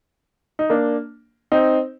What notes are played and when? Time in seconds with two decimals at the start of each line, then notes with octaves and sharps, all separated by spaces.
0.59 D#4
0.70 A#3 D4
1.52 C4 D#4